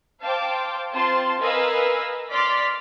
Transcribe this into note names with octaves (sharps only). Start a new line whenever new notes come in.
C5 F5 G5 A5 D6
C4 F4 A5 C6
A#4 B4 D#5 F5 G#5 E6
D5 C6 D6 F6 A6 B6